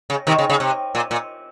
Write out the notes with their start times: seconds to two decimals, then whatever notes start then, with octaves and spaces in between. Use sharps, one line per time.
0.10 C#3
0.27 C3 D#3
0.38 C#3
0.50 C#3
0.60 C3
0.95 A#2
1.11 A#2